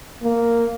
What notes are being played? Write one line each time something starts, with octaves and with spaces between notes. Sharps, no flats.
A#3